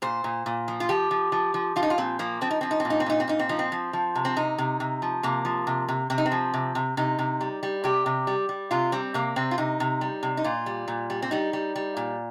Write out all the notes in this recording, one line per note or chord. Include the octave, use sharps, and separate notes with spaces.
A#2 C5
A#2
A#2
F3
F4
F3 G4
F3
F3
F3
F3 F4
D#4
F4
A#2 C4
F3 A#3
F3 C4
D#4
F3 C4
D#4
C4
A#2
D#4
C4
A#2 D#4
C4
A#2 D#4
C4
F3 D#4
C4
F3
F3
C3
C4
C3 D#4
C3
C3
F3
C3 A#3
F3
C3
C3
C3 C4
D#4
C4
F3
C3
C3
C3 D#4
C3
G3
G3
C3 G4
C3
G3
G3
C3 F4
G3 C4
C3 A#3
C3 C4
F4
C3 D#4
C3
G3
C3
D#4
A#2 F4
G3
A#2
G3
C4
G3 D#4
G3
G3
A#2